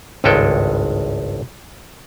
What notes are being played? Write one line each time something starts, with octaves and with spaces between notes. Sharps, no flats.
G#1 C#2 G2 G#3 A4 G5